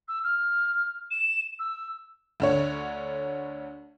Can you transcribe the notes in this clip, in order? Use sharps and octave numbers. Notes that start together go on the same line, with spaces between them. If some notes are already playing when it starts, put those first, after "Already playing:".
E6
F6
E7
E6
D2 D3 C#5